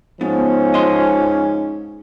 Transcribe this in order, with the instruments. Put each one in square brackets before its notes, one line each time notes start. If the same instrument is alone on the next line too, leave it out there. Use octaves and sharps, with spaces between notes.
[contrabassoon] G#2 [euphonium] F3 [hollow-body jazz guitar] B3 [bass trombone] C#4
[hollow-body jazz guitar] D#5 C6